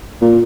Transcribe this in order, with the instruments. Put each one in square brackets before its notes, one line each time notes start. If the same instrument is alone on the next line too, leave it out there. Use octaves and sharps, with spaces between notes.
[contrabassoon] A#2